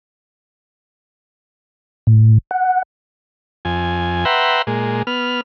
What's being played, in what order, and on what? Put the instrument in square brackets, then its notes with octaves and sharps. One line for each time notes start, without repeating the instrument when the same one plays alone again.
[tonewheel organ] A2
F#5
[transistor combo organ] F2 G#5
B4 E5 F#5 G5 A#5 C6
A#2 G#3
B3 F6